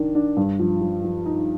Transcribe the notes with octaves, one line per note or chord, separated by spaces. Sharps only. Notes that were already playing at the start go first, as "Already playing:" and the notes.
Already playing: D#3 D4
D4
G2
F3
F3
F3
D#4